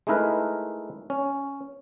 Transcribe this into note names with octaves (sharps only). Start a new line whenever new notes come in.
G#3 A3 D#4 E4 A#4 B4
C#4